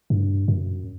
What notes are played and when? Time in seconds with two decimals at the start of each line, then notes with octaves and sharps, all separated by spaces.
0.10 G2
0.48 F#2